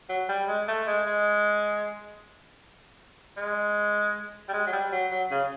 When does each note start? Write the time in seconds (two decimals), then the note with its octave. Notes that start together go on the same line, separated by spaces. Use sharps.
0.09 F#3
0.29 G3
0.48 G#3
0.68 A3
0.87 G#3
1.07 G#3
3.37 G#3
4.49 G3
4.53 G#3
4.67 F#3
4.73 G3
4.92 F#3
5.11 F#3
5.31 C#3